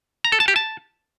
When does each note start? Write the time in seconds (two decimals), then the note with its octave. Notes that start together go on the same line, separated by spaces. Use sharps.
0.24 A#5
0.32 A4
0.40 A5
0.48 G4
0.56 A5